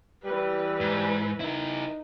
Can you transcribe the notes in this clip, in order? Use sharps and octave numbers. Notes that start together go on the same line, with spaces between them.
E3 G3 B4
G#2
D#4 E4 A#4